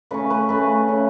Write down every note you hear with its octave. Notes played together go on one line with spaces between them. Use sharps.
C#3 A3 C#4 B4
B4
C#3 A3 C#4 B4
C#3 A3 C#4